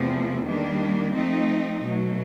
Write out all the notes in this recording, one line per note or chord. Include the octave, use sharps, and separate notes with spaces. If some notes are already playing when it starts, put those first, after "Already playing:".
Already playing: E2 C3 F3 A3 C4
D#3 G3 A#3 D4
F3 A3 C4 D#4
B2 F#3 A3